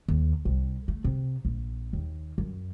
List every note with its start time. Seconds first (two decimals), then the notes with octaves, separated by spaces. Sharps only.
0.08 D#2
0.45 C2
0.88 A3
1.04 C3
1.45 A#1
1.93 D#2
2.38 F#2